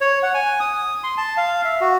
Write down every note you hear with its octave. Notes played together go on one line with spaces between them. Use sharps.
C#5
F#5
G#5
D#6
C6
A5
F5
E5
F#4